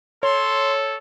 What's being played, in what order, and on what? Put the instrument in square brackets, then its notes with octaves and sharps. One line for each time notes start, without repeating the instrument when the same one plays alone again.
[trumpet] A4 [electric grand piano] C#5 [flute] C6